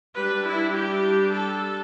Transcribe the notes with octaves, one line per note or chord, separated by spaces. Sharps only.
G3 D4 B4
E4
G4
A4